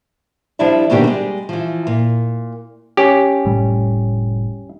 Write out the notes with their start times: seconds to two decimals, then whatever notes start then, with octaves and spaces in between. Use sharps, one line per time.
0.59 F3 G3 D4 E4 D5 E5
0.90 G#2 B2 D#3 A#3 D4 G4
1.04 G3 G#3
1.49 E3 F3
1.87 A#2
2.97 C#4 G4
3.45 F1 A2 G3